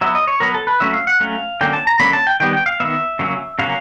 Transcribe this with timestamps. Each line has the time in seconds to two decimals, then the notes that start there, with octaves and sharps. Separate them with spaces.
0.01 F#3 B3 E5
0.15 D#5
0.27 C#5
0.40 F#3 B3 A#4
0.54 A4
0.67 B4
0.80 F#3 A3 C#4 E5
0.93 F5
1.07 F#5
1.20 F#3 A3 C#4 F5
1.61 D3 F#3 A#3 C#4 G5
1.73 A5
1.87 A#5
2.00 D3 F#3 A#3 C#4 B5
2.13 A5
2.27 G5
2.40 D#3 G3 B3 G5
2.53 G5
2.66 F5
2.80 D#3 G3 B3 E5
3.19 C#3 F#3 A#3 C#4
3.59 C#3 F#3 A#3 C#4 F5